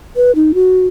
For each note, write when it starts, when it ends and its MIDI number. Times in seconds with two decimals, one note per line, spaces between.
0.16 0.31 71
0.35 0.52 63
0.54 0.87 66